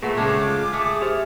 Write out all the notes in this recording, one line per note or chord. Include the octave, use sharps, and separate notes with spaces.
A#2 A3 G#4 B4 F#5
C#3 G#3 A5 D6
F4
A3 G#4
G4 C5 E5